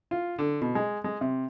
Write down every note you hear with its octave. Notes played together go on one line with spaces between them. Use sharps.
F4
D3
B2
G#3
G#3
C3